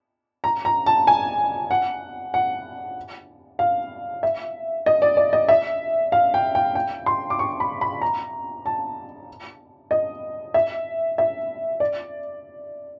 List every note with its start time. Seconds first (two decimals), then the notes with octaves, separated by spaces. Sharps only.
0.44 A#5
0.65 A#5
0.86 A5
1.07 G#5
1.71 F#5
2.34 F#5
3.59 F5
4.23 E5
4.86 D#5
5.02 D5
5.17 D5
5.33 D#5
5.49 E5
6.12 F5
6.34 G5
6.55 G5
6.75 G5
7.06 C6
7.30 D6
7.39 C#6
7.60 B5
7.81 B5
8.01 A#5
8.66 A5
9.91 D#5
10.54 E5
11.18 E5
11.80 D5